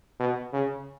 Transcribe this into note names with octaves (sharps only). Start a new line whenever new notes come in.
B2
C#3